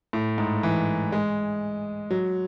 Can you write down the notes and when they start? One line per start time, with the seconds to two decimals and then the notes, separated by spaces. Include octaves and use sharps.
0.13 A2
0.38 G#2
0.63 E3
1.12 G#3
2.11 F#3